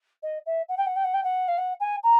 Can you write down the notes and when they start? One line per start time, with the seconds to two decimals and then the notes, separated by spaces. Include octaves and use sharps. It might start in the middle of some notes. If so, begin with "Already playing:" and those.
0.23 D#5
0.46 E5
0.69 F#5
0.77 G5
0.86 F#5
0.96 G5
1.04 F#5
1.14 G5
1.24 F#5
1.48 F5
1.58 F#5
1.80 G#5
2.03 A#5